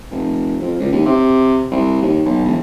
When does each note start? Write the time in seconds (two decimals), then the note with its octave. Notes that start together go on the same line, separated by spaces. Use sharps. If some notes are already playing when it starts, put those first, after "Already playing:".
0.11 F1
0.61 F2
0.80 C#2
0.92 D#2
1.05 C3
1.71 C2
2.02 D#2
2.25 B1
2.45 E1